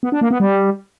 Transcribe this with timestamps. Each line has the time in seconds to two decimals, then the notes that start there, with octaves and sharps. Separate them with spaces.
0.03 B3
0.12 D4
0.21 A#3
0.31 B3
0.40 G3